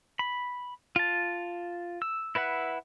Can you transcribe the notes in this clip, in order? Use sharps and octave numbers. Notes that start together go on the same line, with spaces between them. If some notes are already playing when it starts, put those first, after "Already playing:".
B5
F4 A5
E6
E4 B4 E5 F#5